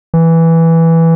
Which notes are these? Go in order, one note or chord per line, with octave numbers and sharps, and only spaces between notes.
E3